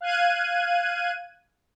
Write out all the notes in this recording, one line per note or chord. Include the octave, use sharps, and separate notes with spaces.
F5 F#6 G#6 D#7